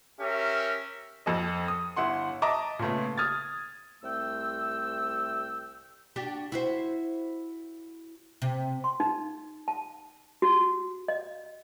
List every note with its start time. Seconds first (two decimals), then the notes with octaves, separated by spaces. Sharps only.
0.21 C#4 G4 A#4 E5
1.26 F2 A4 D#5
1.68 D#6
1.96 G1 E4 F#5 C6
2.42 D#5 E5 A5 A#5 D6
2.79 A#2 C#3 A3 B3
3.18 D#6 F6 G#6 A6
4.03 C2 C3 A3 G5 E6
6.16 D4 F#4 G4
6.52 E4 F#4 C5
8.42 C3
8.84 C6
9.00 D#4
9.68 A5
10.42 F#4
11.08 D#5